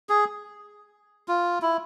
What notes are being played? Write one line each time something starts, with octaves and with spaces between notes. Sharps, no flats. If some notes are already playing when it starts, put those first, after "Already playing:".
G#4
F4
E4